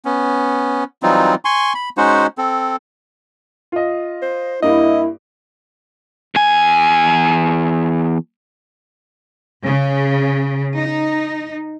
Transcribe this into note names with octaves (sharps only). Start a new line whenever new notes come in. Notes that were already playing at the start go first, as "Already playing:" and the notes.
B3 C#4
E3 F#3 G3 C4 D#4 F4
G#5 C6 C#6
B5
G#3 C#4 D#4 F#4 C5 F#5
C4 A4
F4 D#5
C5
G2 A#3 E4 D#5
E2 G#5
C#3
D#4